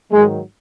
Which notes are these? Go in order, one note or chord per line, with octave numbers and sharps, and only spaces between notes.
G#2 D#3 F#3 G#3